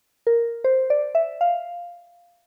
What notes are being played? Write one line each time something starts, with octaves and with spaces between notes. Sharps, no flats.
A#4
C5
D5
E5
F5